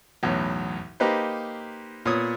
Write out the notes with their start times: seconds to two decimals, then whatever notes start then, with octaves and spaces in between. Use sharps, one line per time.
0.23 B1 E2 A2
1.00 A#3 D#4 G4 B4 C5
2.06 A#2 B3 C#5 D#6